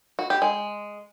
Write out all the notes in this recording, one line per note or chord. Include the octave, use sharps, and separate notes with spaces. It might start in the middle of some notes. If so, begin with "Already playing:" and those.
F#4
G4
G#3